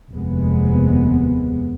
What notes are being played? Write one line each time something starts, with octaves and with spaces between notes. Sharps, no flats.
F1 D#2 C3 G#3 B3